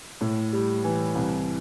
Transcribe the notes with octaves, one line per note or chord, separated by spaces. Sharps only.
A2
G3
E3
C2